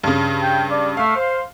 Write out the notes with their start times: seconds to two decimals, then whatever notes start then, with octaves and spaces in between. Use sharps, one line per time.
0.04 G2 C#3
0.43 G5
0.71 D5
0.97 A3 F5
1.16 C5